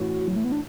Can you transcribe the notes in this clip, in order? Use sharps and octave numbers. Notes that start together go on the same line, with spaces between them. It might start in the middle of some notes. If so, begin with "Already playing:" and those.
Already playing: A1 A2 E3 F#4
F#3
A3
B3
D4